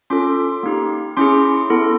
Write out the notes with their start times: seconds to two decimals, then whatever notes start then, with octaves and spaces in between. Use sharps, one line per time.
0.10 C#4 F4 A4 C6 D6
0.63 A#3 D#4 G4
1.17 C#4 E4 G#4 C6 D6
1.70 B3 E4 A4